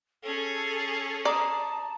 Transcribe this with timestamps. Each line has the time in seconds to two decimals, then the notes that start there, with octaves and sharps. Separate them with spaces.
0.24 C#4 G#4 A4
1.25 D5 A5 A#5 D#6